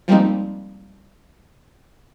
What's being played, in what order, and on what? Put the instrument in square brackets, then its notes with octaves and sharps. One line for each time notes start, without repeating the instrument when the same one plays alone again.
[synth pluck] F3 G3 G#3 A#3 C4 D#4